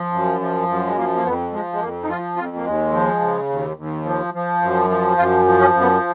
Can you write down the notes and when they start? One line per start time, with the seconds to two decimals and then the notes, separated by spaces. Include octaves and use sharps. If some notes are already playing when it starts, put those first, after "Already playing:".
Already playing: F3
0.12 F#2
0.41 F3
0.69 F#2
0.86 G#3
0.97 F3 A#3
1.15 A#3
1.25 F2 B3
1.53 F3 G#3
1.73 G#3
1.81 F2 A#3
2.03 D#4
2.08 F3 F4
2.36 F2 F4
2.56 A#3
2.65 D#2 G#3
2.93 F3
3.21 C#3
3.50 D#2
3.77 D#2
4.05 F3
4.34 F3
4.62 F#2
4.90 F3
5.17 F#2 F4
5.45 F3
5.60 C#4
5.74 F#2
5.81 B3